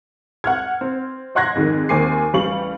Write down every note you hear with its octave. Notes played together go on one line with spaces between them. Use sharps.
F#5 F6 G#6
C4
D#5 F#5 C6 F#6 G#6 A#6
F2 G#2 D#3
D#2 C4 G#5 D6 C7
A1 G3 F5 C#6 F#7